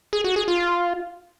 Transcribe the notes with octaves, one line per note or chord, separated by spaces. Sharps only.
G#4
F#4
G#4
F4